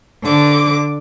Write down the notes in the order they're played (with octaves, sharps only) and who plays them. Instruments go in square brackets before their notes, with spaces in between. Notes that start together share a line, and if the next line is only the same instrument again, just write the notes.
[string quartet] D3 D6